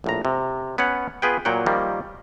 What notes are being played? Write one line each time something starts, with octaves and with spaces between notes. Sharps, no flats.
A#1 A2 A#5
C3
B3 C#4 C#5 F#5
B3 F4 G#4 B4 G5
A#2 F#3 F#5 G5
D#3 F3 G3 A#3